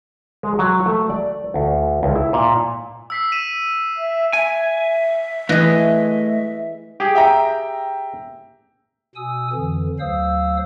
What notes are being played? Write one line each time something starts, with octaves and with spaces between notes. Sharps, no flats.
G#3
F#3
A3
D5
D2
C#2
E4
A#2
E6 B6 C7
B6 D#7 E7
E5
E5 G#5
E3 A3 G#4 D#5
G4 G#4
E5 G5 A#5
B2 G#5 D#6 E6
F2 D3 E3
D2 F#3 C5 F5 D#6 E6